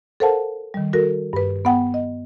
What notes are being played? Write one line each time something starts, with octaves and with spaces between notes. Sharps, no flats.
A4 A#4 C5 F5 F#5 A5
D#3 G3
F#4 A4 A#4
G2 B4
B3 F#5 G5
D#5